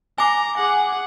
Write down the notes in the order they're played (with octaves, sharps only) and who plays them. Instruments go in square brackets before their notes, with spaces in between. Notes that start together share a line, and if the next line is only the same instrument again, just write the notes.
[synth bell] G#5 D6 [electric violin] A#5
[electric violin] G#4 F#5